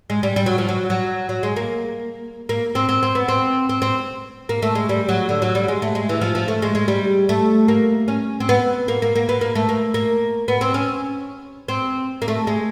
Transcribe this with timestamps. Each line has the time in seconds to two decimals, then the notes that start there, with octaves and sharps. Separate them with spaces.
0.10 G#3
0.23 G3
0.36 G3
0.46 F#3
0.58 F3
0.69 F#3
0.90 F#3
1.29 F#3
1.43 G#3
1.56 A#3
2.49 A#3
2.75 C4
2.89 C4
3.03 C4
3.15 B3
3.28 C4
3.69 C4
3.82 C4
4.49 A#3
4.62 A3
4.75 G#3
4.89 G3
5.09 F#3
5.29 D3
5.42 F#3
5.55 G3
5.68 G#3
5.82 A3
5.95 G#3
6.09 E3
6.21 F3
6.35 F3
6.48 A3
6.62 G#3
6.75 G#3
6.88 G3
7.29 A3
7.68 A#3
8.08 C#4
8.40 C4
8.49 B3
8.88 A#3
9.02 A#3
9.15 A#3
9.29 B3
9.41 A#3
9.55 A3
9.69 A#3
9.94 A#3
10.48 B3
10.61 C4
10.74 C#4
11.68 C4
12.22 A#3
12.28 A3
12.47 G#3